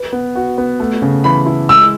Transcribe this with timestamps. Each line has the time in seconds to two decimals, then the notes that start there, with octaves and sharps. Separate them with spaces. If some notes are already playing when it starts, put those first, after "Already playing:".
Already playing: B4
0.12 B3
0.35 F#4
0.58 B3
0.80 A3
1.02 C#3
1.24 E3 B5
1.46 E4
1.69 G#3 E6